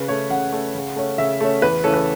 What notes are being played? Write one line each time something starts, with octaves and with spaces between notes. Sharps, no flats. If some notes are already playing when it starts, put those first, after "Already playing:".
Already playing: C#3 B4
A3 C#4 C#5
C#3 F#5
A3 C#4
C#3
A3 C#4
C#3 E5
A3 C#4
E2 B4
C#3 E3 A3 C#4 A4
B4